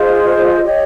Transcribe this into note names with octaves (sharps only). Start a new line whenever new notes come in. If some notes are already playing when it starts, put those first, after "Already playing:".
Already playing: F4 G#4 C5 D#5
G4 C#5